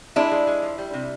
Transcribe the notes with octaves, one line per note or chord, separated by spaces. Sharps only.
G#3 D4 E4
G#3
G#3
F3
G3
C3